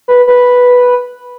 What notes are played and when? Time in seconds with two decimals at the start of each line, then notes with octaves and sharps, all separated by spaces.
0.08 B4
0.27 B4